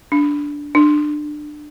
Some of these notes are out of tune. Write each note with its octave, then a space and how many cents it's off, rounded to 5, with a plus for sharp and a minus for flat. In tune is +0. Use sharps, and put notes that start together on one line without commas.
D4 -10
D4 +25